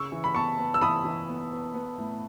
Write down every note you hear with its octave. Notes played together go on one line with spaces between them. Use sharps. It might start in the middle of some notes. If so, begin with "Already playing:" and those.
Already playing: C#3 C#6 E6
E3
B5
B3 A5 C#6
B3
E6
E3 B5 D#6
E3
B3
B3
B3
A2